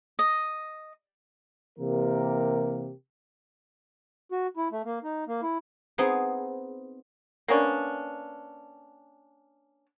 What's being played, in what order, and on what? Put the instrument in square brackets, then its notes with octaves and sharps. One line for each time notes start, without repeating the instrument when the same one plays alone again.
[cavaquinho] D#5
[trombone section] C3 E3 A#3 G4 A#4
[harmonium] F#4
E4
A3
A#3
D#4
A#3
E4
[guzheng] B3 C4 D#4 G#4
[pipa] A#3 B3 C#4 D4